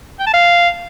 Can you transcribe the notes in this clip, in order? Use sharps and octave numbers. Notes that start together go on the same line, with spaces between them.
G5
A5
F5